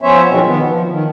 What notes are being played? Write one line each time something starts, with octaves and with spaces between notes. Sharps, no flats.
F3 B3 C#4 C5 C#5 E5
B2 D#3 F3 F#3 G#3 C4
D#3 B3
F3
D#3